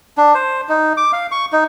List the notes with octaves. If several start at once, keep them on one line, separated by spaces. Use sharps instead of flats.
D4
C5
D#4
D6
F5
C#6
D#4